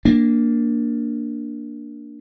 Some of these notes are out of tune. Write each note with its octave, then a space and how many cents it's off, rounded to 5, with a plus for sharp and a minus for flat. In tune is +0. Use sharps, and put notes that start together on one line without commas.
A#3 +0 D4 +0